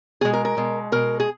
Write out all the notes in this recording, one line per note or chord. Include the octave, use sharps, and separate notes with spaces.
B2 G#3 G#4
A#4
A#4
B2 G#3
B2 G#3 A#4
G#4